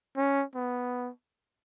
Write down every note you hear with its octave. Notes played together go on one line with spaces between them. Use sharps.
C#4
B3